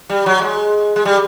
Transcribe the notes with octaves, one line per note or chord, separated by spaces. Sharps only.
G3
F#3
G#3
G#3
G3